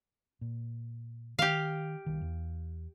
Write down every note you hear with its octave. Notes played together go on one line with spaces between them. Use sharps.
A#2
D#3 G4 F5
C2 D#3
E2